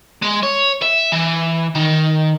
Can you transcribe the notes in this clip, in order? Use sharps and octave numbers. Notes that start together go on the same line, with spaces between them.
G#3
C#5
E5
E3
D#3